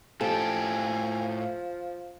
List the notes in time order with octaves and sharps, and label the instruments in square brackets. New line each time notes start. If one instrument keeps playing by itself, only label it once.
[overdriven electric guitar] A2 G4 [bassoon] F3 [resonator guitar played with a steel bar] A4 [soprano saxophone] G#5